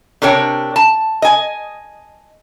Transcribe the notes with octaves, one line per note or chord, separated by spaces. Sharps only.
C3 D4 A#4 C#5 G5
A5
D#5 G#5